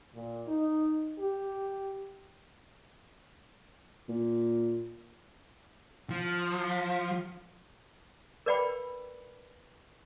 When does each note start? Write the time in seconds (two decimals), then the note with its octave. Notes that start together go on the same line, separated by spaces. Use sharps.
0.14 A#2
0.47 D#4
1.19 G4
4.09 A#2
6.10 F3
8.46 A#4 B4 D5 F#5 G5 B5